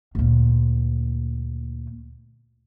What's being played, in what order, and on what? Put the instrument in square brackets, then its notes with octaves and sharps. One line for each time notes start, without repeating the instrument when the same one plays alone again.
[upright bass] D2 A#2